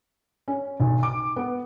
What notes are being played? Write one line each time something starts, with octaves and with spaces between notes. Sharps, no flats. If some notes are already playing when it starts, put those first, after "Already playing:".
C#4
B1
D6
B3